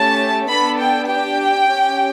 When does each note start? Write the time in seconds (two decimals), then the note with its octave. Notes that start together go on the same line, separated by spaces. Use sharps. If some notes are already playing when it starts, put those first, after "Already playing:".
Already playing: A3 C#4 G4 A5
0.49 B3 D4 A4 B5
0.79 G5
1.08 D4 G4 G5
1.69 C#4 G4